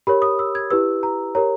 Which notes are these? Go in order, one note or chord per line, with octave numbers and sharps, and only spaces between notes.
G4 A#4 C#5 B5
D#6
E6
G#6
E4 G4 B4 E6
A#5
G4 A#4 C#5 A#5